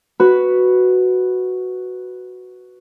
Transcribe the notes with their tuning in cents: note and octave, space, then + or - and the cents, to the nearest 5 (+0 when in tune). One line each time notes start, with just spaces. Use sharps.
F#4 +0 B4 +0 B5 +0